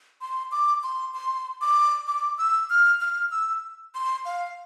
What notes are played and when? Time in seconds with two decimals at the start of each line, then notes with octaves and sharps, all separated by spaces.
0.21 C6
0.52 D6
0.83 C6
1.14 C6
1.61 D6
2.07 D6
2.38 E6
2.70 F6
3.01 F6
3.31 E6
3.95 C6
4.25 F5